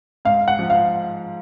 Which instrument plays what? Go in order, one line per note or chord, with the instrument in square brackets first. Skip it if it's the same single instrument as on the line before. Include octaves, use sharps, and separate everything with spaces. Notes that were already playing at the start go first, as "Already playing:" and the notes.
[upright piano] G#2 [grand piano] F5
[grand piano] F#5
[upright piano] F3
[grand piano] F5